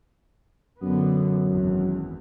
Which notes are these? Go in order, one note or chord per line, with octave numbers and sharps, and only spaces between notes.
F#2 D3 B3
G#1 E2